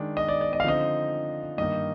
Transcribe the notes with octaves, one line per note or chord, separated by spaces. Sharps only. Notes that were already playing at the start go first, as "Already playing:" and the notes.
Already playing: D#3 G#3 D4
D#5
D5
D5
D#5
F5
D3 F3 C4 D#4 D#5
G2 D#3 A#3 D#4 D#5